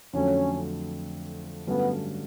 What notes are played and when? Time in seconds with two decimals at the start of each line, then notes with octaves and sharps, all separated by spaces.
0.13 F2 D3 F#3 A3 C#4
1.67 G2 D3 F#3 A3 B3 C#4